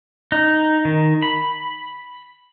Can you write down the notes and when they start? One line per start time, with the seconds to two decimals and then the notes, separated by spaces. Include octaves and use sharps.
0.32 D#4
0.85 D#3
1.22 B5